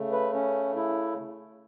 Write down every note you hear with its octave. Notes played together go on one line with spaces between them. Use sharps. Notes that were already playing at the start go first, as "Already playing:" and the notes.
Already playing: C#3 A3
B4
C#4
E4